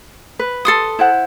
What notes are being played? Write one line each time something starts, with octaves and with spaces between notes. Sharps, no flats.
B4
A4 C6 D#6
E4 C5 F#5